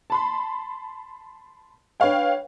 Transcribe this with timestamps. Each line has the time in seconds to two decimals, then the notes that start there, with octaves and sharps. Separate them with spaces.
0.10 A5 B5 C6
2.00 D4 B4 C#5 F5 G5